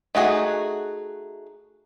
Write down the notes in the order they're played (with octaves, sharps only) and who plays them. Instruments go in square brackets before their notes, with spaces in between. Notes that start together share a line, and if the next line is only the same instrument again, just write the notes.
[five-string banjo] A3 D#4 F#4 G#4